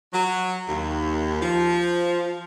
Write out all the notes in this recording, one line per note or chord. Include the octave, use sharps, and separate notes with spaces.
F#3
D#2
F3